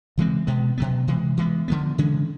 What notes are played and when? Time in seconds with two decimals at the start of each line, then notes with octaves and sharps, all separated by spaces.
0.18 C#3 E3 G#3 C4
0.47 B2 G#3 B3
0.78 B2 F#3 B3
1.07 C3 E3 G#3
1.37 E3 G#3 B3
1.68 D3 F3 G#3 B3
1.98 C#3 E3 G#3 C#4